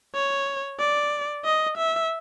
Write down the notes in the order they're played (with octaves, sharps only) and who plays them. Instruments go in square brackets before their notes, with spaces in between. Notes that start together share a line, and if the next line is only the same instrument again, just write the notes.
[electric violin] C#5
D5
D#5
E5